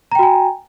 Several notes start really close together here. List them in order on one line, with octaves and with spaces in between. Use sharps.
A#5 G5 F#4 G#5